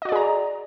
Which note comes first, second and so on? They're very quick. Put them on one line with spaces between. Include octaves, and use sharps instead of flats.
D#5 F#4 D5 G#4 A#5